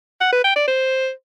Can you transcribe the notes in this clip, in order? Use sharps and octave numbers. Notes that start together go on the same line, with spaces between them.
F#5
B4
G5
D5
C5